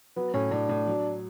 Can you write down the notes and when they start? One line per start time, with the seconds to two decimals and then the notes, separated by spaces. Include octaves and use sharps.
0.16 F#3 B3
0.34 A2 C#4
0.51 A2 D4
0.69 A2
0.87 F#3